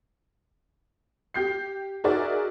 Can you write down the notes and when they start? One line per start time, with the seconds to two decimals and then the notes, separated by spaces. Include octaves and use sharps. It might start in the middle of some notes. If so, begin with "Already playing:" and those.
1.34 G4 G6 C7
2.04 D#4 F#4 G#4 A#4 D5 E5